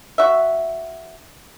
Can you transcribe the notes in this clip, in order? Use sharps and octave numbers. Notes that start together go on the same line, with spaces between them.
F#4 E5